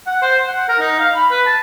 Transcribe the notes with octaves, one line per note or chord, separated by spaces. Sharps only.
F#5
C5
F#5
A#4
D#4
F5
B5
B4
A5